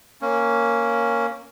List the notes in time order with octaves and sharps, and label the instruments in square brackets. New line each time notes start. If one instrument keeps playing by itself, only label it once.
[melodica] A#3 C#4